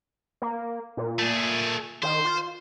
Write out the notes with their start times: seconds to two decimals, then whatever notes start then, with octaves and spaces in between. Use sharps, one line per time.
0.42 A#3
0.97 A#2
1.19 A3 G#4
2.03 D#3 C5
2.25 F4